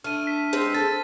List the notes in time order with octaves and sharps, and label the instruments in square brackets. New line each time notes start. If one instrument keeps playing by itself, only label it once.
[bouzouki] A3 [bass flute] D4 [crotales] F6 D#7
[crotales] B6
[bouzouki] G#3 C4 C5
[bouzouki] A4 [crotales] A6